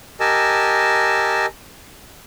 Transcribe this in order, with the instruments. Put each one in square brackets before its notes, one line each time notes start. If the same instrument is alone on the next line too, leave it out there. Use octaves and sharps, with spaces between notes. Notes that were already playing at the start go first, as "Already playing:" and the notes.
[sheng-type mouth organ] G4 A#4 D#5 G#5 A5 E6